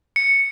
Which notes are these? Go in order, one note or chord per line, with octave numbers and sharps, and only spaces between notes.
C#7